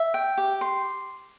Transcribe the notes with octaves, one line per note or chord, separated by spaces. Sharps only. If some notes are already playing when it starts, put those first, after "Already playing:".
Already playing: E5
G5
G4
C6